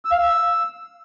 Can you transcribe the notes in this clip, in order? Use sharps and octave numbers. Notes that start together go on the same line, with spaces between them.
E6
F5
E6